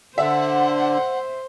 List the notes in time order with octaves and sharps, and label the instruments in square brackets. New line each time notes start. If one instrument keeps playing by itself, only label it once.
[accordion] D3 [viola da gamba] C5 [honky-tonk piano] E5 [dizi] F#5